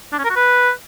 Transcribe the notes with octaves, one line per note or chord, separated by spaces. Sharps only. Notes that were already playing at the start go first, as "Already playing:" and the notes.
D4
C#4
A#4
F#4
B4